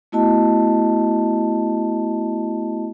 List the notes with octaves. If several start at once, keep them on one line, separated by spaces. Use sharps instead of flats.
A3 B3 E4 F#4 D#5 A5